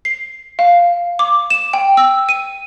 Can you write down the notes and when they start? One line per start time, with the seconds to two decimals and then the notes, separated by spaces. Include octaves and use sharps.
0.05 C7
0.59 F5
1.19 D6
1.50 E7
1.73 G5
1.97 E6
2.29 D#7